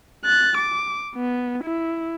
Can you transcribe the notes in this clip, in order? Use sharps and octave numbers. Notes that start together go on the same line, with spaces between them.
F#6 A6
D6
B3
E4